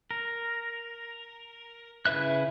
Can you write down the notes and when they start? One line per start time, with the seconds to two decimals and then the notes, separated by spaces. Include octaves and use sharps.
0.11 A#4
2.06 C#3 E4 B4 E5 F#6